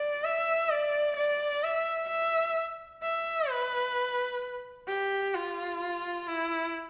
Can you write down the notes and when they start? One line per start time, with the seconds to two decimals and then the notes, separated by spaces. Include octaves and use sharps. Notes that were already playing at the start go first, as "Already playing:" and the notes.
Already playing: D5
0.24 E5
0.70 D5
1.17 D5
1.64 E5
2.09 E5
3.02 E5
3.50 B4
4.88 G4
5.35 F4
6.28 E4